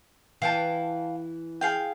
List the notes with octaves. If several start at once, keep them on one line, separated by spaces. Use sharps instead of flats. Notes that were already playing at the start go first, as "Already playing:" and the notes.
E3 F5 G5 A5
G#4 F5 G5